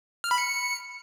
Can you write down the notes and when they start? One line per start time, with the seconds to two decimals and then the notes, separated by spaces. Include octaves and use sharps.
0.24 F6
0.31 B5
0.38 C#7